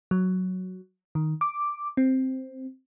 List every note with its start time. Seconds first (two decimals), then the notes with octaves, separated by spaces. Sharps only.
0.11 F#3
1.15 D#3
1.41 D6
1.97 C4